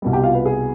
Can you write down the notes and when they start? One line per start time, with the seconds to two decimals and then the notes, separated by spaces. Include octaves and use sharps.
0.02 C2 B2 G3
0.13 G4 G5
0.23 F4 F5
0.34 B4
0.46 G#4